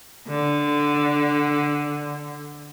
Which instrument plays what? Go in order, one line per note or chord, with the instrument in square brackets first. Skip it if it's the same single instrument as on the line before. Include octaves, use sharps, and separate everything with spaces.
[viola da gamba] D3